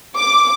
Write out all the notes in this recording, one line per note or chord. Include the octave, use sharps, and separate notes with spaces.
D6